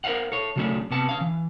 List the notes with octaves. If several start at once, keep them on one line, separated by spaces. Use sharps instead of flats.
A#4 C5 D#5 F5 F#5
A4 C#5
C#3 F#3 G3 A3 C#4 D4
C3 B3 A5
C#4 F5
E3